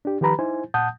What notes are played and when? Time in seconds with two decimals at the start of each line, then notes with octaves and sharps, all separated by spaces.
0.05 D4 G4
0.21 D#3 F3 G4 B4 A#5 B5
0.39 D#4 E4 C5 G#5
0.74 A#2 F#5 A5 D#6 G6